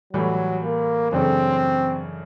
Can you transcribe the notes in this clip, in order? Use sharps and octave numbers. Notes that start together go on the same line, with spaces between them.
A2 E3 F#3 G3
A#3
F#2 C#3 E3 A3 C4 D4